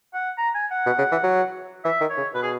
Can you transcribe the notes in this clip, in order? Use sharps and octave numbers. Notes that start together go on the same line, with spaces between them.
F#5
A#5
G#5
F#5
B2
C#3
E3
F#3
E3 E5
D#3
C#5
C#3
B2 B4
G#4